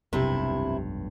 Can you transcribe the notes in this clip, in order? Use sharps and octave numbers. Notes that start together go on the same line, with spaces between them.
F1 B1 G2 C3 E4